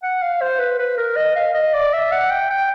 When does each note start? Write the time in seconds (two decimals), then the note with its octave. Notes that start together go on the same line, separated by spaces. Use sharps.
0.03 F#5
0.22 F5
0.41 C5
0.59 B4
0.79 B4
0.98 A#4
1.17 D#5
1.36 F5
1.54 D#5
1.74 D5
1.93 E5
2.12 F#5
2.31 G5
2.50 G5